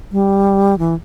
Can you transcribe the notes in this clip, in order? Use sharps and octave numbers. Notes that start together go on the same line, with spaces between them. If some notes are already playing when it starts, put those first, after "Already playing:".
G3
E3